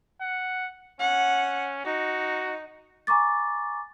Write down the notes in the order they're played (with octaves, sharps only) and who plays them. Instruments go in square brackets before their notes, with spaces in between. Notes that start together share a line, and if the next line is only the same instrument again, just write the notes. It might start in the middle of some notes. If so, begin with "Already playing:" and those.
[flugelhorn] F#5
[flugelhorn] C#4 [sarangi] F#5
[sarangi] D#4 [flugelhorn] F#4
[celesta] G#5 A#5 C#6 D6 A6